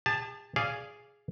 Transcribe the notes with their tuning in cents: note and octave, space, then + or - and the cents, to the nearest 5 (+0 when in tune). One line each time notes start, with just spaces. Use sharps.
G#4 -40 A5 +0
G#4 +0 D5 -5 F5 -10